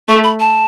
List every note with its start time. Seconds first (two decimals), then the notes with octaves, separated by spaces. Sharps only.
0.08 A3 C#6
0.24 B5
0.40 A5